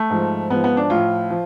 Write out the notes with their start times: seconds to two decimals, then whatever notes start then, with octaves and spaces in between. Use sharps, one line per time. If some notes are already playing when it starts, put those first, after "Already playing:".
Already playing: A3
0.10 G#2 F3
0.50 G#2 F3 B3
0.64 B3
0.77 D4
0.90 A2 F3 F4
1.30 F3